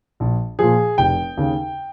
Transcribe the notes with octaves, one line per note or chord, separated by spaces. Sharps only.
A#1
A#2 F3 G#4
F1 G5
D#2 C#3